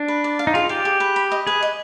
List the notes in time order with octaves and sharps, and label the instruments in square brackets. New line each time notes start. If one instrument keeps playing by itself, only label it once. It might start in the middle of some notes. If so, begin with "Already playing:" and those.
Already playing: [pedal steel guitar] D4
[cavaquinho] B4
D5
F5
[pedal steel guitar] D#4
[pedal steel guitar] F4 [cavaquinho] G#4
[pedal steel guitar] G4 [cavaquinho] D5
[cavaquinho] G#4
B4
B5
D#5
[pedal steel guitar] G#4 [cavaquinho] B4
[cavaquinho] D#5